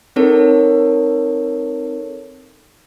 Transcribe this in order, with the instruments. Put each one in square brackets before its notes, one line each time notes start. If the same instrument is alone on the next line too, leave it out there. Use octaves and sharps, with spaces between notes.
[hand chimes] C4 D#4 A4 A#4 C#5